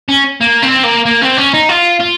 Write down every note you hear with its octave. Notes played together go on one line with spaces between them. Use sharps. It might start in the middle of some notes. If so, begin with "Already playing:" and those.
C#4
A#3
C4
A#3
A#3
C4
C#4
D#4
F4
F4